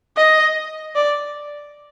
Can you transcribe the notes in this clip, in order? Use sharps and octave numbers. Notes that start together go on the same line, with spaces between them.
D#5
D5